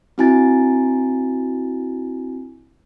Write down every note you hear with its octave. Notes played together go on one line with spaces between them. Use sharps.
C4 D4 E4 F#4 G#5 A6